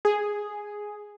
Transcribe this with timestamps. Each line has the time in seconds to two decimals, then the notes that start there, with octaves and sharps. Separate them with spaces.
0.05 G#4